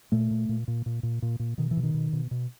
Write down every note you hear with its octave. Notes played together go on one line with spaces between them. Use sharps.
A#2 A3
A#2
A#2
A#2
A#2
A#2
A#2
A#2
B2 D#3
E3
B2
D#3
B2
B2
B2